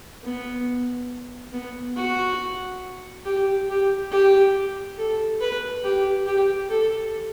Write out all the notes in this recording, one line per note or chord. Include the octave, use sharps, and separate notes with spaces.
B3
B3
F#4
G4
G4
G4
A4
B4
G4
G4
A4